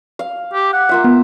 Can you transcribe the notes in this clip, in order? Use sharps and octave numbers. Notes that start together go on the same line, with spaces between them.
F5
G4
F#5
A#3 F4 E5
B3